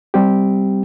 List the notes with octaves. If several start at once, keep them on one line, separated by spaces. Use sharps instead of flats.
G3 C4 G4